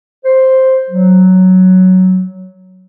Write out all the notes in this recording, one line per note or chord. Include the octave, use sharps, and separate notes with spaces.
C5
F#3